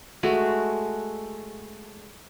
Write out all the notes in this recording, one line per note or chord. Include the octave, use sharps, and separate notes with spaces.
G#3 A3 F#4